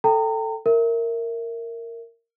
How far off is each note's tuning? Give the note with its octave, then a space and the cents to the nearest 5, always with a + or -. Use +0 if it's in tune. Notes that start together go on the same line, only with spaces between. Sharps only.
A4 +5 G5 -5 A#5 -35
A#4 -15 E5 +0